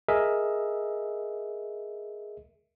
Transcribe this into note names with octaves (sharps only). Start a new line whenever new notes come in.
G#4 A#4 D#5 E5